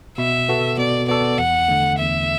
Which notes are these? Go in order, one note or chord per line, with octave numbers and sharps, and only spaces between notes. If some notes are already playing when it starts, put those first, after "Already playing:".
B2 E5
B3 F#4 A4
B2 D5
B3 F#4 A4 D5
E2 F#5
D3 A3
E2 E5